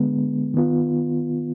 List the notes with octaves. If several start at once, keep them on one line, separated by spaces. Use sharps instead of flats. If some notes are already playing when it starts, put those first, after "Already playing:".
Already playing: D3 G#3 B3
D#3 B3 F4